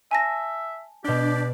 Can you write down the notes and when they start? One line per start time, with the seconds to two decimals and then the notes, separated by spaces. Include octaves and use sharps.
0.11 E5 G#5 A5 A#6
1.04 B2 D4 G4 D5 G6